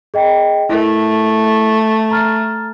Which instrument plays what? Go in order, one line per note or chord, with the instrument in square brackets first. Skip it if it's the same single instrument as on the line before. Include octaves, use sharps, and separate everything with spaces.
[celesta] G#4 D#5 G5
[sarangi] A3 [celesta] E4 A#4
[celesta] A#5 F6 A6